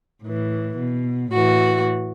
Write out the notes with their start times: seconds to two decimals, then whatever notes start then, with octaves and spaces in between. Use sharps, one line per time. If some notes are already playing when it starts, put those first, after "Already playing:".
0.23 A2 E3
0.78 B2
1.32 A2 E3 F#4